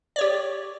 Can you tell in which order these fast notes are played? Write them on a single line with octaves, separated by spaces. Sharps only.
D5 C#5 G4